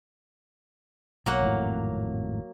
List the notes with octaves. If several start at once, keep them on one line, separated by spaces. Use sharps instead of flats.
B1 F#3 A#3 F#5
G#1 F2 A2